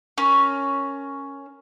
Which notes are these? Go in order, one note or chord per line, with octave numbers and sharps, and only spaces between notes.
C#4 A#4